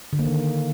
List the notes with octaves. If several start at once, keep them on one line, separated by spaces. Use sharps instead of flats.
D3
A#3
D#3